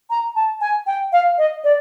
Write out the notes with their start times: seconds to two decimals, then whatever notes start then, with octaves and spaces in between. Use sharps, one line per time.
0.10 A#5
0.36 A5
0.61 G#5
0.87 G5
1.13 F5
1.38 D#5
1.64 D5